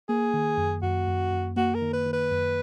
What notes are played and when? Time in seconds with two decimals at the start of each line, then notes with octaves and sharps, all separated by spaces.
0.09 A#3 G#4
0.34 D#3
0.57 F#2
0.82 F#2 F#4
1.07 F#2
1.32 F#2
1.56 A#3 F#4
1.75 A#4
1.81 D#3
1.93 B4
2.06 D#3
2.13 B4
2.31 F#2